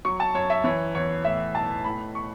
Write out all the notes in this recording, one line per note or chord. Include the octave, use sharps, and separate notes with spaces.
F#3 C#6
A5
F#2 C#5
E5
E3 C#5
E2 C#5
A2 E5
B1 A5
A2 B5
C#6